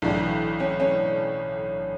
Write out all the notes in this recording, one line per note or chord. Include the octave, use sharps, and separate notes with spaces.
B1 A2 E3 D4
C#4
C#4